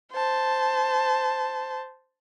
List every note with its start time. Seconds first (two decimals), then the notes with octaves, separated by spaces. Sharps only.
0.12 C5 A5